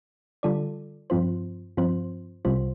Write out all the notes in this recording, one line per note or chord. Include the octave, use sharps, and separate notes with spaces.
D3 G3 F4 A4 D5
G2 F3 C4 F4 C5
G2 F3 C4 F4 C5
C2 C3 G3 F4 C5